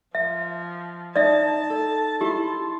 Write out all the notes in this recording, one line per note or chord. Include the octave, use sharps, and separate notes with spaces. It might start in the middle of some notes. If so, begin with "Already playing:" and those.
F3 E5
D#4 D5 E5 A5
A4
E4 G4 C6